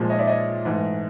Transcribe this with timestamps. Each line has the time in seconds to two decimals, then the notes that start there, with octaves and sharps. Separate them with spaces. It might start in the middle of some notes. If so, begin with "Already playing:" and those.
Already playing: A#2 F3 G#3
0.09 C#5 D#5
0.19 D5 E5
0.27 C#5 D#5
0.65 G#2 E3 A3